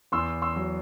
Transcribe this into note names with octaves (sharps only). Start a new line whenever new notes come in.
E2 C6 E6
C6 E6
F#3